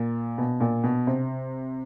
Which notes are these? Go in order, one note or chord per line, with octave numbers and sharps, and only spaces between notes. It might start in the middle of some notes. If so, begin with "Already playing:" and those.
Already playing: A#2
B2
A#2
B2
C3